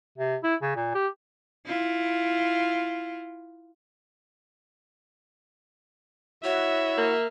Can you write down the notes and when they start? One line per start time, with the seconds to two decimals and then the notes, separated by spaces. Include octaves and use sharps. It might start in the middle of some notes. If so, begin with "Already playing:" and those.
0.18 C3
0.44 E4
0.62 C#3
0.76 A#2
0.95 G4
1.66 E4 F4
6.44 E4 F#4 C#5 E5
6.98 A#3